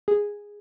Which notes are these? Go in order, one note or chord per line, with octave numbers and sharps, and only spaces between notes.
G#4